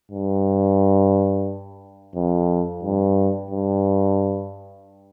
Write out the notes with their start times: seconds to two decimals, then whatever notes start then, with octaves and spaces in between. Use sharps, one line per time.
0.12 G2
2.15 F2
2.83 G2
3.51 G2